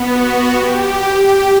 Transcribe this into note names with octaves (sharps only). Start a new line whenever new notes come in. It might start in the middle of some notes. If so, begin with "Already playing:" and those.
Already playing: B3
F#4
G4